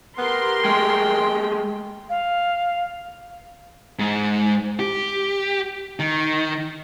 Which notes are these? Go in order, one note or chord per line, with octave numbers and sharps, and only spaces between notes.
B3 G4 A#4 C6
G#3 A3 G5
F5
G#2
G4
D#3